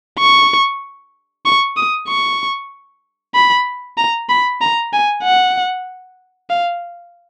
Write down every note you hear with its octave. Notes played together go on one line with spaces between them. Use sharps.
C#6
C#6
D#6
C#6
B5
A#5
B5
A#5
G#5
F#5
F5